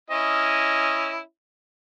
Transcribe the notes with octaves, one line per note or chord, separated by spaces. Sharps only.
C#4 E4 D#5